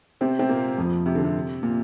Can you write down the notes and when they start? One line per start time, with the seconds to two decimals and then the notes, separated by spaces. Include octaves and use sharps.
0.21 C3 C4
0.39 C3 C4
0.49 A#2 A#3
0.78 F2 F3
1.06 C3
1.15 D3
1.24 C3
1.63 A#2